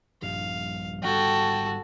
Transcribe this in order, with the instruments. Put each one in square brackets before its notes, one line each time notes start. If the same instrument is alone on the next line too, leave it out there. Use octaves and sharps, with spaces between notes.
[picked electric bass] A#1 G2 G3 [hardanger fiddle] F5
[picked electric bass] G#1 G3 [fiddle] F#4 A4 [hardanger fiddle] G5 A5